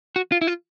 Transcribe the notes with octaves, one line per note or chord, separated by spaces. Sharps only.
F#4
F4
E4
F4